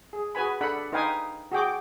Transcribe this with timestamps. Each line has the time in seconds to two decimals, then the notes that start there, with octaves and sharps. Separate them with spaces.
0.13 G#4
0.35 F#4 G#4 B4 G#5 B5
0.61 D4 A4 F#5 B5
0.92 D#4 B4 F5 G5 G#5 D#6
1.52 F#4 G#4 G5 D6